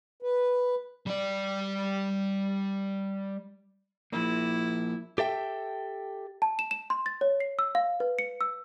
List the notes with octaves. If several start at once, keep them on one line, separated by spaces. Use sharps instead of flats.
B4
G3 D5
F3 A#3 E4
G4 A4 E5 G5
A5
E7
E7
C6
A6
C#5
C7
E6
F5
B4
C#7
E6